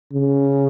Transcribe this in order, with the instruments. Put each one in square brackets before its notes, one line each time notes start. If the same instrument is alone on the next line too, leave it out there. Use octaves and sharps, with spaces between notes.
[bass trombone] C#3